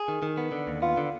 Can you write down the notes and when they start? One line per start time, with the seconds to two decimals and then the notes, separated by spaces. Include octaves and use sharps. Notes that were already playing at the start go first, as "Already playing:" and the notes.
Already playing: G#4
0.08 D#3
0.23 D#3
0.37 B3
0.52 D3
0.67 D#2
0.82 B3 F4
0.97 D3